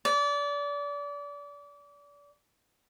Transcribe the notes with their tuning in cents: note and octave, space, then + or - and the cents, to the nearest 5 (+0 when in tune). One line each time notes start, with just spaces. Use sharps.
D5 -30